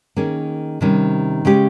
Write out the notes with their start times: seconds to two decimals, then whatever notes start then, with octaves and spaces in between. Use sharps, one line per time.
0.16 D#3 A#3 C#4 G#4
0.81 C3 D#3 G3 C#4
1.45 C#3 G#3 C#4 G4